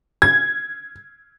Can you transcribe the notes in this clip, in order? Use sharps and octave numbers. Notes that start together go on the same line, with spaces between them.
G#6